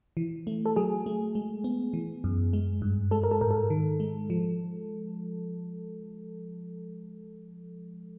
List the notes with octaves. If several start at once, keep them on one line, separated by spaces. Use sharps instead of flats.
E3
A3
A4
F#3 G#4
A3
G#3
B3
E3
F#2
G#3
G2
G#3 A4
A#4
A4
G#2 A#4
A4
D#3
G#3
F3